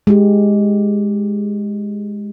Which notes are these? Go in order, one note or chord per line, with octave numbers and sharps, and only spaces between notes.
G#3 G4